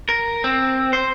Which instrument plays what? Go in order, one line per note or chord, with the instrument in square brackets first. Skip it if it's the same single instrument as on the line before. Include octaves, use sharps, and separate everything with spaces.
[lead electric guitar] A#4
C4
C5